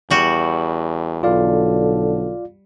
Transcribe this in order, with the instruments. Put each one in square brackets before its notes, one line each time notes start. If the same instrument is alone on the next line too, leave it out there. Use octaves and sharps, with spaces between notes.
[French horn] E2 [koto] G3 F#4
[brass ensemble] B1 D3 A4 [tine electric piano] F4 D5 F5